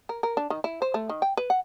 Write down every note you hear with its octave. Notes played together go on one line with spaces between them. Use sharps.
A#4
A#4
D4
D#3
E4
C5
A3
D#3
G5
B4
F#5